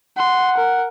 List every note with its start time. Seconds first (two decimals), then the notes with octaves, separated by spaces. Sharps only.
0.17 F#5 C6
0.57 A#4